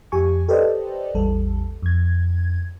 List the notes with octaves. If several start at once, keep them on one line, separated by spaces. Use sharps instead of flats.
F2 G4 G#5 C#6
G4 A4 B4 C5 D5 D#5
A1 E2 G3 A4
F2 G#6